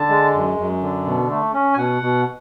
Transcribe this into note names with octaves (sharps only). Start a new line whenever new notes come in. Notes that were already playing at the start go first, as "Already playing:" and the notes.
Already playing: D3 A5
G#3
F#2
F#2
D3
B2
A3
C#4
G#5
B2 F#5
B2